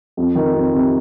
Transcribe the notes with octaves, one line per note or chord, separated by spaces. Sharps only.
F2
D#3
F2
C3